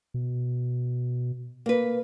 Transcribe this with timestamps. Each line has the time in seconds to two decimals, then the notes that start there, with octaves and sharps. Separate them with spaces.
0.14 B2
1.66 A#3 B4